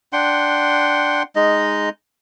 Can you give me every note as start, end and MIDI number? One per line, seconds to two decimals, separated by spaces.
0.13 1.23 62
0.13 1.23 78
0.13 1.23 79
0.13 1.23 84
1.36 1.89 56
1.36 1.89 63
1.36 1.89 75